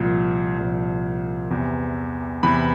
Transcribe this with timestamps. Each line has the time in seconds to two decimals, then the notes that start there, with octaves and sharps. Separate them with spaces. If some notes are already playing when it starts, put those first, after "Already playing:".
Already playing: C2 A#2 F3
0.58 C2 A#2 F3
1.50 E2 C3 E3
2.43 E2 C3 E3 B5